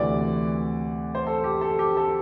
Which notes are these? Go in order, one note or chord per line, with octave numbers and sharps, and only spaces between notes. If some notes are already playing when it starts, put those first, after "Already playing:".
Already playing: D2 C3 E3 D5
C5
A4
G4
A4
G4
A4